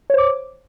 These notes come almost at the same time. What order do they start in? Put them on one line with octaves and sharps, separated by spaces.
C#5 C5 D6